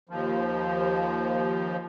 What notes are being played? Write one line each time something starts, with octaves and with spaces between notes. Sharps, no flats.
D#2 F3